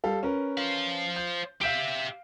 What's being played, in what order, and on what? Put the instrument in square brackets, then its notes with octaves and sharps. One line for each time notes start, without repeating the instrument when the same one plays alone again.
[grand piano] G3 A4 F5
C#4 A#4 B4
[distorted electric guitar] C5 F5
[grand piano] G6
[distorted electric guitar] G4 E5 [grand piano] F5 G6 D7